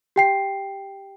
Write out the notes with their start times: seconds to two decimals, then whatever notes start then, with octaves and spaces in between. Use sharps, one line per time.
0.16 G4 G5 C7